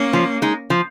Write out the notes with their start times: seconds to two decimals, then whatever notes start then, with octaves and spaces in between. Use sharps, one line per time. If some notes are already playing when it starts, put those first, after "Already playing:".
Already playing: A#3 C#4
0.13 F3
0.42 G#3 D#4
0.70 F3